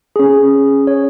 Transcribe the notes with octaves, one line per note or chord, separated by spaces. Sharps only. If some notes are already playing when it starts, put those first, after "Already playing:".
C#4 G#4
C#5